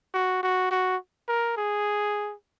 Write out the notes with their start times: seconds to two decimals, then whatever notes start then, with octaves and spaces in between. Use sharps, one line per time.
0.14 F#4
0.43 F#4
0.71 F#4
1.28 A#4
1.57 G#4